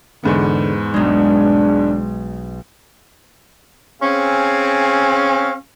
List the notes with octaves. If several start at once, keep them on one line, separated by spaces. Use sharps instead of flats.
E2 G#2 D3 B3
B1 G#3 D4
C4 C#4 G#4 F5